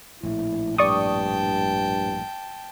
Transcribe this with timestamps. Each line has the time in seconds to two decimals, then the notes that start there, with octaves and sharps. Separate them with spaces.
0.23 A#1 A2 E4
0.78 G2 D5 G5 A5 C#6 D#6